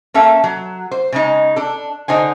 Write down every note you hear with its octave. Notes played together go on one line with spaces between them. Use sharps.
A#3 C#4 A4 E5
F#3
C5
C#3 G#3 D#4
D4 A4
D3 D#4 C5 G#5